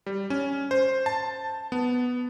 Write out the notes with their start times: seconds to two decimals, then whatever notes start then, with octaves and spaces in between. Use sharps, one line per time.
0.06 G3
0.30 C#4
0.71 C5
1.06 A5
1.72 B3